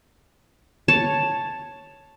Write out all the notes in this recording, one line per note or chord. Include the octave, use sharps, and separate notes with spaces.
C#5 A5